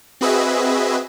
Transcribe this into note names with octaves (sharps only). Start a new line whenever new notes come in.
C4 F#4 G#4 B4 D#5 E5